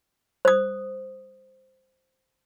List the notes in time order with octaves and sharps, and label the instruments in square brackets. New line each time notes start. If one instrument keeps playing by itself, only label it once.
[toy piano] C5 D#6